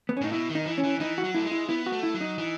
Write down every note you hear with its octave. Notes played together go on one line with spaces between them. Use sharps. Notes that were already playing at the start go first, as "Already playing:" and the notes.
B3
C#4
A2 D#4
B2 E4
D#3
D#4
E3
C#4
E3
E3 D#4
F#4
F#3
A3 E4
G#3
E4
B3 E4
F#4
A3
E4
F#3
D#4
E3